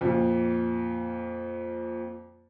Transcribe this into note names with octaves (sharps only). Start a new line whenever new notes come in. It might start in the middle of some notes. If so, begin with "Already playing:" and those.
F2 A#2